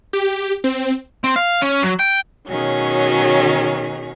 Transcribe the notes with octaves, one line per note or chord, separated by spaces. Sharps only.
G4
C4
C4
F5
C#4
F#3
G5
B2 D#3 F#3 C#4 G#4